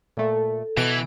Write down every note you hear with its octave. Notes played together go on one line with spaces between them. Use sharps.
A#2 A3 A4
B2 E3 D7